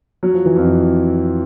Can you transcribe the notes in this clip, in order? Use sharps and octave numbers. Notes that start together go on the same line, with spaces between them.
F#3
F3
E3
F2 F3